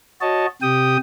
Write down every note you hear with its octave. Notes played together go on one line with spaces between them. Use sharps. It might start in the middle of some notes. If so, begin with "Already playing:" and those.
F#4 C#5 D#5 A5
C3 G4 G5 D#6